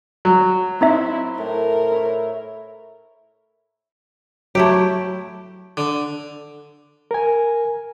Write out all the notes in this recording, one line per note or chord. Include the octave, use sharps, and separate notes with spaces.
F#3
C4 D#4 E4 C5 E5
A2 A#4
E4 C#5
F#3 A3 E4 G4
D3
A#4 G#5